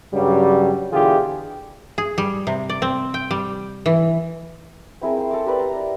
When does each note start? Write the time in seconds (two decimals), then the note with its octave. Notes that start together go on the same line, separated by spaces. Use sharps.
0.13 G2 C#3 F#3 G3
0.93 B2 D3 E3 F4 G4 G#4
1.98 G#4
2.18 G3
2.47 C3
2.70 D5
2.82 C4
3.14 G5
3.31 G3
3.86 E3
5.02 C4 E4 G#4 A#4
5.17 C5 G5 C6
5.31 A4 A#5 D6
5.46 G4 A#4 B4 D5
5.59 A#5 C6
5.80 A#4